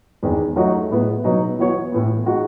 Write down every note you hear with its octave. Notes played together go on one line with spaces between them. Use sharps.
E2 D#3 G#3
F#3 A3 D#4 F#4 C#5
A2 G#3 B3 E4
B2 F#3 B3 D#4
E3 B3 F#4 C#5
A2 E3 B3
G#3 D#4 F#4